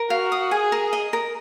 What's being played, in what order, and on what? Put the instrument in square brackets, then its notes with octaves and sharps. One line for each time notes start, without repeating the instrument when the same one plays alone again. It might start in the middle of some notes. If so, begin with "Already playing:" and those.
Already playing: [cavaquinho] A#4
[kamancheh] F#4 [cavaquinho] F5
[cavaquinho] D#6
[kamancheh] G#4 [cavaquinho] G#5
[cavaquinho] A#4
D#5
A#4